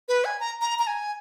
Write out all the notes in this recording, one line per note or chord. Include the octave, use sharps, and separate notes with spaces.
B4
G#5
A#5
A#5
A#5
G#5